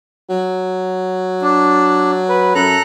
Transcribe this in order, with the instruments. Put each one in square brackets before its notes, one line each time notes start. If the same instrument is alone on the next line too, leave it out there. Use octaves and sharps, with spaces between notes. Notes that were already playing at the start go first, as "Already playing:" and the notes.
[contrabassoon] F#3
[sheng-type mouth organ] D4
B4
[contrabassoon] F#2 [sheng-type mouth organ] A4 A#5 F#6